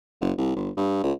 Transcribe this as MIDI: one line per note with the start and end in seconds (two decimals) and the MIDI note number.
0.21 0.32 30
0.38 0.52 36
0.56 0.70 31
0.77 1.03 43
1.03 1.12 37